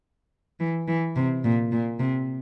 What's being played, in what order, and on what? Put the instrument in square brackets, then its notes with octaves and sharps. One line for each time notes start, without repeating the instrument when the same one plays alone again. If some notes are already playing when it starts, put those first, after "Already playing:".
[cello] E3
E3
C3
A#2
A#2
C3